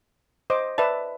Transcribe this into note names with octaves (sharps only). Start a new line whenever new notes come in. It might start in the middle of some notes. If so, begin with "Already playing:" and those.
C5 D#5 D6
B4 D5 E5 A5